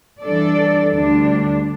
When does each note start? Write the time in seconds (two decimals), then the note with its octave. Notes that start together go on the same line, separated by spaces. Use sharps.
0.22 E3 G3 D4 A4 D5
0.91 D2 D3 G3 D4